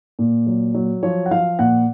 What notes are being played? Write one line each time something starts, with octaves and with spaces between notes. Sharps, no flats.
A#2
F#3
F#3
F3 C#5
F#5
F3 F5
A#2 F#5